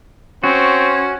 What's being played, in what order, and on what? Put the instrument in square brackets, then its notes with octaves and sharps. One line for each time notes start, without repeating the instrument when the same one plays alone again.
[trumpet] C4 [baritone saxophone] C#4 [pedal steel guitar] F#4